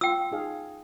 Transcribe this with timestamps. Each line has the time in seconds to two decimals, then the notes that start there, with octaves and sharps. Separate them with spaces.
0.01 F4 G5 E6
0.32 D#4 G#4 F5